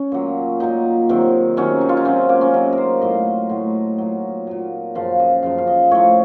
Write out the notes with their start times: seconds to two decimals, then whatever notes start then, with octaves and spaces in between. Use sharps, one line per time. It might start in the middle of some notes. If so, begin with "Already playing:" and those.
Already playing: C#4
0.12 A#2 F#3
0.60 A#2 F#3 D#4
1.09 C3 D#3 F#3
1.57 C3 D#3 F#3 C#4
1.81 D#4
1.89 F4
1.97 D#4
2.05 C3 F#3 C#4
2.29 A#3
2.41 C#4
2.54 C3 F#3 D#4
2.73 A#4
2.78 C5
3.01 A2 F#3 D#5
3.49 A2 F#3
3.98 A#2 F#3
4.47 A#2 F#3
4.95 F#2 C#3 F3 F5
5.20 D#5
5.43 F#2 C#3 F3 F5
5.58 F5
5.67 D#5
5.91 A2 F3 C#5